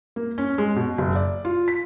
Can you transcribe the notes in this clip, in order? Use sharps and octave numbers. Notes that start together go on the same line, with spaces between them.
A#3
C#4
G#3
B2
F#1
D5
F4
B6